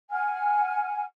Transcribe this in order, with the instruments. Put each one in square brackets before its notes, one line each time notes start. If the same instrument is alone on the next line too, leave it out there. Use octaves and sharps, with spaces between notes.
[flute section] F#5 G#5 F6